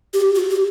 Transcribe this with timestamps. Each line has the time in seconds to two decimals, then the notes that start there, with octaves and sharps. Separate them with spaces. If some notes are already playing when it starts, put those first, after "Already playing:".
0.14 G4
0.35 F#4
0.50 G4